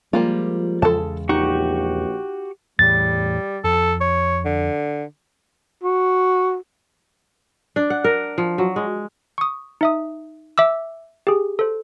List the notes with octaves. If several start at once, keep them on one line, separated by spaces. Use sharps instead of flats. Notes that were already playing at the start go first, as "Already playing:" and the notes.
F3 G3 G#3 A#3 F4
E2 C#3 G#3 A4 A5
A#1 D#4 F#4 G4 C#6
E2 A2 G3 A6
F2 A4
C#5
D3
F#4
D4
F#5
A#4
F3
F#3
G#3
C#6 D#6
D#4 E5 D#6
E5 D6 E6
G4 G#4
A4 C5